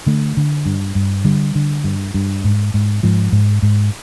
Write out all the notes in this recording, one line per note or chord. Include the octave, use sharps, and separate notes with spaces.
D3 A3
D3
G2
G2
D3 G3
D3
G2
G2
G#2
G#2
G#2 F3
G#2
G#2